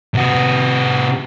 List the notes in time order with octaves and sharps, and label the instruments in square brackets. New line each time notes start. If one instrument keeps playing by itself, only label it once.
[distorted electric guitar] C3 F#4